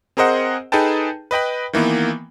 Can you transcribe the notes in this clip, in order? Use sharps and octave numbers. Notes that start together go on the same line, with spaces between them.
C4 G#4 A#4 C5 D#5 F#5
D#4 G#4 A4 B4 G5 A5
B4 D#5 G5 B5
D#3 E3 A#3 B3